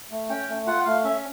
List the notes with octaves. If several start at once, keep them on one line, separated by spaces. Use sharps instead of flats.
A3
C#4 G5
A3
F4 F#5
A3 F5
C#4 E5